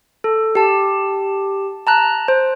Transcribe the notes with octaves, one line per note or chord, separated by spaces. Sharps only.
A4
G4 A5
A5 A#5 F#6
C5